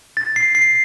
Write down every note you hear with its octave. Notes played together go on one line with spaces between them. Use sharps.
A6
C7
C7